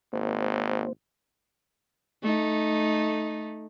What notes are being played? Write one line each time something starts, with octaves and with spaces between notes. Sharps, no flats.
G#1 A#3 C5
A3 D#4